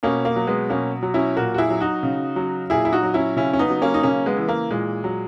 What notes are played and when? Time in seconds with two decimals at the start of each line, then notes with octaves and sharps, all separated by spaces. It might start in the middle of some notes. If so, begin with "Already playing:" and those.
0.03 B2 A#3 C#4
0.25 A#3
0.36 F#3
0.47 G#3 B3
0.70 B2 A#3 C#4
1.03 F#3
1.14 C#4 E4
1.36 A#2 F#4 A#4
1.54 F#4
1.58 E4 G#4
1.70 F#3
1.80 D#4 F#4
2.03 C#3
2.36 F#3
2.70 A#2 E4 G#4
2.85 E4
2.92 D#4 F#4
3.03 F#3
3.14 C#4 E4
3.36 C#3 C#4 E4
3.53 C#4
3.59 B3 D#4
3.70 F#3
3.82 A#3 C#4
3.94 D#4
4.03 C#3 A#3 C#4
4.26 G#3 B3
4.37 E3
4.48 A#3
4.70 A#2 G#3
5.04 F#3